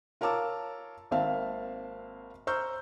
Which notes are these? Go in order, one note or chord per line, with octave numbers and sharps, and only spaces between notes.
F4 A#4 C#5 A5 D6 E6
G#1 A#3 C4 E5 F5 A5
C5 A#5 C#6 E6 F6 G6